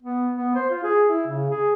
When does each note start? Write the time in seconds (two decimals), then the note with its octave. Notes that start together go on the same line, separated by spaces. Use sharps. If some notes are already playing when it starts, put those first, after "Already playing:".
0.03 B3
0.35 B3
0.55 C5
0.70 F4
0.84 G#4
1.08 E4
1.28 C#3
1.51 G#4